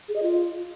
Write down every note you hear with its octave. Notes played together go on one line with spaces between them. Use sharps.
G#4
D#5
F4